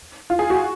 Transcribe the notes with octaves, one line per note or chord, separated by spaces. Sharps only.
F4
G#4
F#4